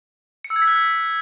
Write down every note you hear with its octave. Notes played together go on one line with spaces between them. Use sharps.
C#7
E6
G#6
B6
F#6